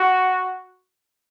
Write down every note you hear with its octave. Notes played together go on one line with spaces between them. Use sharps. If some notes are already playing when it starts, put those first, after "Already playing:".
Already playing: F#4